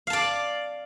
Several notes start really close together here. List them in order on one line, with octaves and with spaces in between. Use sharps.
F5 A5 D5